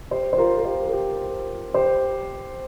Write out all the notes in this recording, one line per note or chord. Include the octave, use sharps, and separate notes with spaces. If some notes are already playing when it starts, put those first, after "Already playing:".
G4 C5
C5
F4 A#4
A#4
G4 C5
A#4
G4
G4 C5